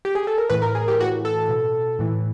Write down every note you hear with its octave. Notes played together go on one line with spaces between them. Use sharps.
G4
G#4
A4
A#4
A2 E3 B4
A#4
G#4
G4
A2 E3 F#4
A4
B2
A2 E3